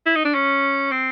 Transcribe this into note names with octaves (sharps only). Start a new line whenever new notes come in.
E4
D#4
D4
C#4
C4